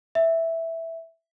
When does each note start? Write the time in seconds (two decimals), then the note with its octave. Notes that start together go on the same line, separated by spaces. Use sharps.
0.15 E5